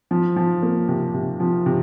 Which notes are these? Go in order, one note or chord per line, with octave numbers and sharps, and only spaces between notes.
F3
F3
A#3
C3
C3
F3
C3